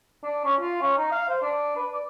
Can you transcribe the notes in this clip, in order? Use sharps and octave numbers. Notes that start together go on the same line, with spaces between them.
D4
C#4
F4
C#4
D#4
F5
C5
D4
B4
D5